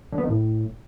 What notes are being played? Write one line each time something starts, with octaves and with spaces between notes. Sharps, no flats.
D3
B3
D#3
A2